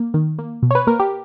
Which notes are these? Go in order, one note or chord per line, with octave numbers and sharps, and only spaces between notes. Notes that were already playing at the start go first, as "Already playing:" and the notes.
Already playing: A#3
D#3
A#3
B2
C#5
B4
A#3 A#4
G4